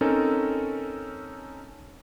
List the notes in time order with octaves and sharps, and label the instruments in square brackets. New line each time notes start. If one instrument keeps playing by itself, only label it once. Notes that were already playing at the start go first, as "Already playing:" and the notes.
[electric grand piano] C4 C#4 D#4 A4 A#4